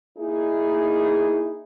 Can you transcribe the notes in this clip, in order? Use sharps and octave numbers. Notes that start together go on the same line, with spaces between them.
A#3 D#4 E4 G#4